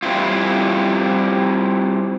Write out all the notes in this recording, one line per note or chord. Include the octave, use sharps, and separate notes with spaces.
G3 C4 E4 F4